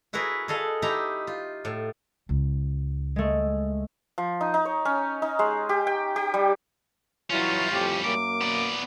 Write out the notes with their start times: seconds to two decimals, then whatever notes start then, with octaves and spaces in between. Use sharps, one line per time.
0.13 E4 F#4 G#4 A#4 B4
0.48 G#4 A4 D#5 F5
0.82 D#4 E4 G4 A#5
1.27 F4
1.65 A2
2.29 C#2
3.16 G#3 A3
4.18 F3
4.41 D#4
4.54 D#4
4.65 C#5
4.85 C#4
5.22 D#4
5.39 G#3
5.69 G4
5.87 G5
6.16 G4
6.34 G3
7.30 E3 F#3 G3 C#4 E4 F4
7.70 F2 A2 G4
8.04 F#2 A#3 D6
8.41 B3 D5